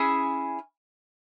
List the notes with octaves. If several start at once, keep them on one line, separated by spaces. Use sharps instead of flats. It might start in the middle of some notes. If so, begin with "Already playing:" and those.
Already playing: C#4 E4 G#4